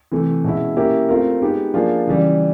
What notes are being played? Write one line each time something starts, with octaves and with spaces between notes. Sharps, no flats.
C3 E3 A3
B2 G#3 C#4 E4
A#3 C#4 E4 G4 A#4
A3 C4 F4 A#4
G#3 B3 D#4 G4
F3 A#3 D4 F4 G#4
C#3 E3 G3